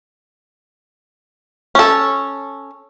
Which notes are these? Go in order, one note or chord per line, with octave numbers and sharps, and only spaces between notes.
C#4 A4